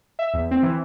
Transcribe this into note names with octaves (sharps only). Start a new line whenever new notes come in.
E5
E2
C4
E3